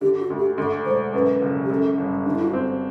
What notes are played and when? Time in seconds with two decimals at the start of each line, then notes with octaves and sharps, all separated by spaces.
0.01 D3 G4
0.20 F#4
0.30 D2
0.39 G4
0.57 D2 A4
0.85 E1 C5
1.14 F#2 B4
1.42 F#1
1.64 G4
1.70 F#2 A4
1.98 G1
2.25 D3 D4
2.35 E4
2.44 F#4
2.53 C4